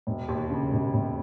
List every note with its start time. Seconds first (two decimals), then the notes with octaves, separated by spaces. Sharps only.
0.07 E1
0.28 D#2
0.50 C#3
0.72 E1
0.94 E1